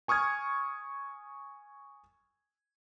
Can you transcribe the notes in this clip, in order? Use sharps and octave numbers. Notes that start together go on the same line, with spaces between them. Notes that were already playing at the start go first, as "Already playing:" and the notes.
G#5 C#6 D#6 F6 G#6